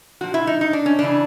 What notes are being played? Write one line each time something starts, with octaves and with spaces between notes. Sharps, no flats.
A#2 F3 F#4
E4
D#4
D#4
D4
C#4
C#3 E3 D4